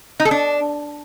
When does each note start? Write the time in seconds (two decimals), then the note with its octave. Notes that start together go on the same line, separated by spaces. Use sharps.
0.20 D#4
0.25 A4
0.31 D4